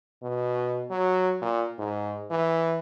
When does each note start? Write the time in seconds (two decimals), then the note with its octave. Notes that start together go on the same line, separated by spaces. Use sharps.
0.22 B2
0.90 F#3
1.42 A#2
1.78 G#2
2.31 E3